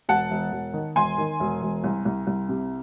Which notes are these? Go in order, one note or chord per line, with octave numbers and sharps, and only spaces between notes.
E1 F#5 A5
E1
E1
D#3
E1 G#5 C6
D#3
E1
E1
C2
C2
C2
C3